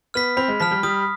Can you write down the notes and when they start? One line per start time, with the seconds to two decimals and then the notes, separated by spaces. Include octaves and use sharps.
0.14 B3 F6 B6
0.37 C4 B5
0.48 G#3
0.60 F3 F6 B6
0.71 G3
0.83 G3 D#6